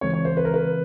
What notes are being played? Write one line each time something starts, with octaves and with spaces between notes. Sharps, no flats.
C#3 E3 G#3 C4 C#5
C#5
C5
B4
A#4
B4